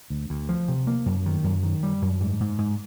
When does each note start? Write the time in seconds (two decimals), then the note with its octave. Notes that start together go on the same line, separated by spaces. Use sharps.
0.10 D2
0.30 D2
0.49 F3
0.68 C3
0.87 A#3
1.06 F#2
1.26 D#3
1.44 F#2
1.63 D#3
1.83 G3
2.02 F#2
2.20 G#2
2.40 G#2
2.58 G#2